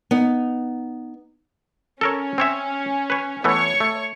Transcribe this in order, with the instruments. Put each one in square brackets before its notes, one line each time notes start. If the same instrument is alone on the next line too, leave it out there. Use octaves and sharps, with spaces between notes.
[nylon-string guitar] B3 D#4
[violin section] C#4 [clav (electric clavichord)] A4 A#4 C#5
[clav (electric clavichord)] C4 C#5 E5
B4 C#5
[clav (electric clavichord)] E3 A3 B3 [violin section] C#5 C#6
[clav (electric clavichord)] A3